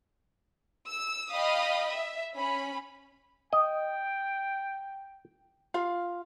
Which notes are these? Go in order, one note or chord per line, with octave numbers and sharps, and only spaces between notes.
E6
D#5 F5 G5 B5 D#6
E5
C#4 B5
D#5 G5
F4 F5